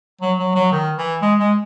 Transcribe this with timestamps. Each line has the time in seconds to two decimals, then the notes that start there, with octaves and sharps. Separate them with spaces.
0.21 F#3
0.38 F#3
0.55 F#3
0.72 D#3
0.98 E3
1.22 G#3
1.39 G#3